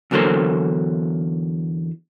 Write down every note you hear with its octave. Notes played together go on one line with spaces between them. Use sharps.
E2 D3 F#3 A#3 A4 C5